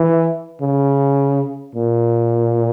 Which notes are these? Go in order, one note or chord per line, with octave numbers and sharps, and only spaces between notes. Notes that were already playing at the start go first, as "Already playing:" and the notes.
Already playing: E3
C#3
A#2